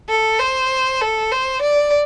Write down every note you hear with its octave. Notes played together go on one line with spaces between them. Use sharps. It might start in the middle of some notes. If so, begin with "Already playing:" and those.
A4
C5
A4
C5
D5